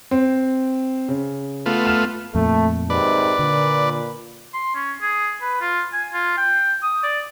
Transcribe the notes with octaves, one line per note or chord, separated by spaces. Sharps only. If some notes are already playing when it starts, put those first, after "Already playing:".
C4
C#3
A3 B3 F4
F6 E7
F2 A#2 A3
G#2 C3 D#3 B4 D5
A#2 D3
C6
C#4
G#4
B4
F4
G#5
F4
G5
D#6
D5